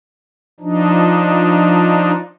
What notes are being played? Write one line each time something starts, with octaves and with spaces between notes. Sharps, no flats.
F3 D4 D#4